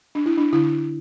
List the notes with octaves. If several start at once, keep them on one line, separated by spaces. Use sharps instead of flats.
D4
E4
D4
D3 E4